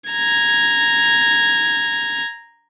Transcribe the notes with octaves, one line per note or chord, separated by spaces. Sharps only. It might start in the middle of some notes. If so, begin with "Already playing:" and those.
A#5 G#6